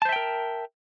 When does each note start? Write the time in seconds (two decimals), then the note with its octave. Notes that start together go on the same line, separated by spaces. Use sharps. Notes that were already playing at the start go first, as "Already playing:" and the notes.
0.02 A5
0.05 C5
0.09 E5
0.12 G5
0.16 A#4